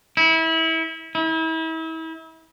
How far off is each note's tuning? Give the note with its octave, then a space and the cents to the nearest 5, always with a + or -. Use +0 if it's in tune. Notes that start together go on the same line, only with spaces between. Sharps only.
E4 -25
E4 -35